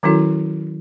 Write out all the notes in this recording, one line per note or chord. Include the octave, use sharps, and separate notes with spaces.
D#3 F#3 C#4 E4 F#4 A4